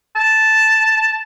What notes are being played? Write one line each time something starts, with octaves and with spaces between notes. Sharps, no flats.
A5